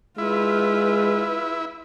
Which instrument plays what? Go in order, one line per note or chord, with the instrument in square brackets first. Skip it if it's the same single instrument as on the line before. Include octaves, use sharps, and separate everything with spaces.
[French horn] G#3 [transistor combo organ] E4 [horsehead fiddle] F4 B4